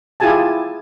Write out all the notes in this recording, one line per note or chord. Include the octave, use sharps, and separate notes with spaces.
E4 F4 G4 G#4 G#5 A5